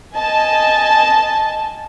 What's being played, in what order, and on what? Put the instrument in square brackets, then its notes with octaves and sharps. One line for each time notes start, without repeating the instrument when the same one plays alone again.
[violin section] D#5 G#5 A5